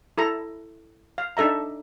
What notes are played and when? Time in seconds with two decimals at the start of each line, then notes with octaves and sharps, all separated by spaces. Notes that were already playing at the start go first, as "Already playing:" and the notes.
0.18 E4 A4 A#5
1.18 F5
1.37 D4 D#4 A4 E5 A#5